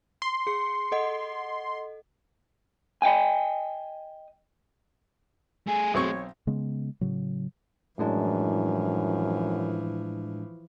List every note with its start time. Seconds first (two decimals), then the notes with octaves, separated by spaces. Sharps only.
0.22 C6
0.47 G#4 C#7
0.92 A4 D#5 F#5
3.02 D#5 F5 G5 G#5
5.67 A3 G#4 G#5
5.94 B1 C4 C#5 C#6
6.47 C#3 G#3 B3
7.01 A2 C#3 F#3
7.99 F#2 A2 E3 F3 G#3 D4